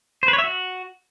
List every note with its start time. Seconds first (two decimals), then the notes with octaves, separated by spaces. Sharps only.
0.23 C5
0.28 B4
0.33 C#5
0.38 E5
0.44 F#4